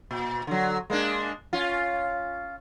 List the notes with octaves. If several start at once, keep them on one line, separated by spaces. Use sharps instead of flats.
A#2
D3 F#3
G#3 A#3 D4
C#4 F4